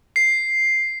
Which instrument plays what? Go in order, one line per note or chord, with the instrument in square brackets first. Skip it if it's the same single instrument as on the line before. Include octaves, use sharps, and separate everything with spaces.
[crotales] C7